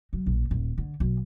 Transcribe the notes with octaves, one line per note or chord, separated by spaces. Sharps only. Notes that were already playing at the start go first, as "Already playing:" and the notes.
F#3
A#1
D#1
D3
B1